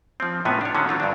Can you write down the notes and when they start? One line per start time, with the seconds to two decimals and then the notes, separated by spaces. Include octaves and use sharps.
0.20 F3 C4
0.45 A2 C3 B3 C#4 F4 G#5
0.61 D4 C#5
0.75 D3 D#3 C#4 F#4
0.88 F#3 C4 F4 A4
1.00 G2 D4